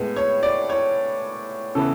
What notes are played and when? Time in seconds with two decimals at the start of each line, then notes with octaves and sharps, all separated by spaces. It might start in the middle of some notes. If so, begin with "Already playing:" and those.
Already playing: A2 G#3 B3
0.16 C#5
0.43 D5
0.70 C#5
1.75 C#3 E3 B3 A4